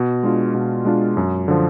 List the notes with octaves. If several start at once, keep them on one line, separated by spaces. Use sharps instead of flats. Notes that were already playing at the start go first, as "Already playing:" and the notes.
Already playing: B2
G#3 D4 F4
B2
G#3 D4 F4
F#2
D3 F3